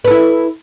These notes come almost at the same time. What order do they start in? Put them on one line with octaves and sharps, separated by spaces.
B4 A4 E4